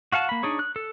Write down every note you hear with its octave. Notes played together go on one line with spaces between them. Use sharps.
F#4 F5 F#5 A5
A#3 B5
D4 D#4 G#4 C#5
F#6
A4